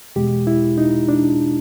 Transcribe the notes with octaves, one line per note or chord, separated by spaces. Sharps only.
E2 B2 G#3 G4
E4
D#4
D4